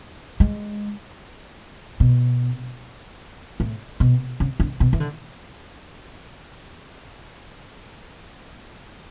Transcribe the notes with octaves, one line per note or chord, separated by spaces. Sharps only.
G#3
B2
A2
B2
C#3
D3
B2
E3
D3